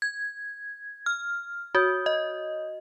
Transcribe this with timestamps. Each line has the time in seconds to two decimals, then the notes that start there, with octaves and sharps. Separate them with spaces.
0.02 G#6
1.06 F6
1.75 F#4 C#5 D#6 G6
2.06 D#5